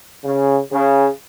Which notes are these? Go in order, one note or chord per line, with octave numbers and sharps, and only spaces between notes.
C#3
C#3